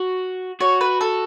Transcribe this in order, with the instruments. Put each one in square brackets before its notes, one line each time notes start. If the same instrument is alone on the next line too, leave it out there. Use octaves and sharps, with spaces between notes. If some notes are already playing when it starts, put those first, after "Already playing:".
Already playing: [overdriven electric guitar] F#4
[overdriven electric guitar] F#4 [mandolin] C#5
[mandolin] B4
A4